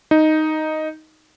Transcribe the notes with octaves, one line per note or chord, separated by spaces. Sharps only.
D#4